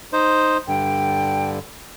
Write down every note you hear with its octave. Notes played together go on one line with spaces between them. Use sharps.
D#4 C5
G2 D3 G5